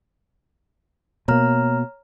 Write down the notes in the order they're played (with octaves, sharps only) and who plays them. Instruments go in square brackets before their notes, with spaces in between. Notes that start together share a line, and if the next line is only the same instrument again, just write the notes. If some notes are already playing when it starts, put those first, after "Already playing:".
[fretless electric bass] B2 A#3 [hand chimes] C#5 A#5 F6